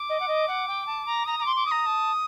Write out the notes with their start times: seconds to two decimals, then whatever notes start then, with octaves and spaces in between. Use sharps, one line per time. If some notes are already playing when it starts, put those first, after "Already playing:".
Already playing: D6
0.09 D#5
0.20 F#5
0.28 D#5
0.48 F#5
0.68 G5
0.87 A5
1.06 A#5
1.26 A#5 D#6
1.39 A#5
1.42 C6 D6
1.56 D6
1.66 D#6
1.71 A#5
1.86 A5